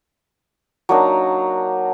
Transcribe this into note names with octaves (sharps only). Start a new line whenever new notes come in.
F#3 A#3 D4 D#4